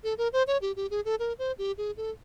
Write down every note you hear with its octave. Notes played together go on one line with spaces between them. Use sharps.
A4
A#4
C5
C#5
G4
G4
G#4
A4
A#4
C5
G4
G#4
A4